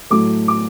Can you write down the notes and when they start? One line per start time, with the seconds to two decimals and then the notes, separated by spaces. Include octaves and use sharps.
0.10 A2 F#3 A3 D6
0.48 D6